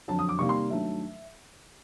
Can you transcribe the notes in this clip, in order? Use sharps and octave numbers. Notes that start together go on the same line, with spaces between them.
F2 D3 F#3 A5
D#6
D6
C3 D#3 G3 A#3 C#6
C6
G2 D#3 F#3 A3 E5